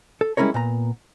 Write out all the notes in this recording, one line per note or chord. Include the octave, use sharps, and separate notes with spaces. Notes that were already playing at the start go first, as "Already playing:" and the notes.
A4
G3 G#3 C#4 E4 A#4 C#5
A#2 B3 A#5